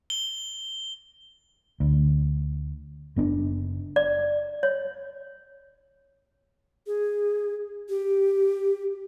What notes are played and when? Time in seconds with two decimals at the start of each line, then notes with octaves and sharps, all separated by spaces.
0.10 G7
1.80 D2
3.16 F#1 B3 D4
3.96 D5
4.63 C#5
6.87 G#4
7.89 G4